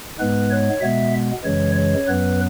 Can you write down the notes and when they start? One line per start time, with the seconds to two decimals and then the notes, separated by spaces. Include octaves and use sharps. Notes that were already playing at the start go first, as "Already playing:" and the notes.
0.19 G#2 G#3 B3 B4
0.51 C#5
0.81 B2 G#3 B3 E5
1.44 F#2 C#3 E3 G#3 C#5
1.76 C#5
2.06 F#2 F#3 B3 B4